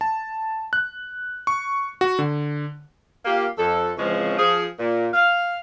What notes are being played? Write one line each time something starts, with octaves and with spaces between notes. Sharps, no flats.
A5
F#6
C#6
F#4
D3
A#3 F4 G4
F2 A4
C#3 E3 F3 G#3 C4 C#4
F3 G#4
A#2
F5